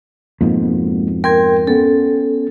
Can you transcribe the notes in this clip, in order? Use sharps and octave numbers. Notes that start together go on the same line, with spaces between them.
F2 G#2 B2 G#3 A#3
A#4 G5 C6 G#6
B3 C#4 A4